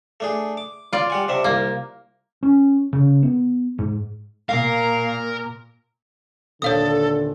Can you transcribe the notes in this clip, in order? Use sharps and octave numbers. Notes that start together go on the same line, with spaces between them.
A3 D4 G#4
D6
F4 D5
G3 F#5 G#5
C3 D4 E5
C2 A#3
C#4
C#3
B3
G#2
A#2 A#4 F5
D#1 D3 A4 C#5 F5 D#6